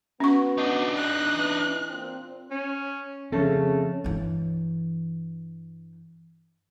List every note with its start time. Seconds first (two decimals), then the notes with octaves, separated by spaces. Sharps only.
0.20 B3 C#4 F#4 C#6
0.58 D4 D#4
0.96 F#6
1.34 E3
1.89 A#2 C4
2.51 C#4
3.32 C#3 F3 A3 C4 C#4 A4
4.04 G2 E3